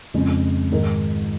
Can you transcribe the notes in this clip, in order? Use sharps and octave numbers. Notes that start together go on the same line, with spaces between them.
F2 C#3 G#3
G#2 D#3 G#3 D#4 A#4